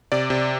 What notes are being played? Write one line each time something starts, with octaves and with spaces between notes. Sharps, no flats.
C3 D5
C3